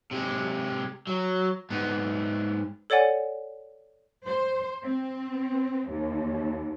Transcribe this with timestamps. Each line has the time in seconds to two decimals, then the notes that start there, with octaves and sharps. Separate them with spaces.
0.11 C3 G#3
1.07 F#3
1.70 G#2 B3
2.90 A4 C#5 D5 F#5 G#5
4.26 C5
4.83 C4
5.89 D#2